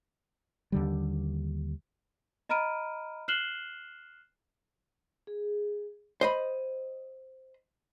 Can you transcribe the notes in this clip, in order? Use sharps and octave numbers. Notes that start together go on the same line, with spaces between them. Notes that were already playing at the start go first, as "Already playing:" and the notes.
D#2 D3 G3
D#5 A#5 B5 F6 D7 D#7
F6 F#6 C7 E7 F#7 G7
G#4
C5 D#5 B5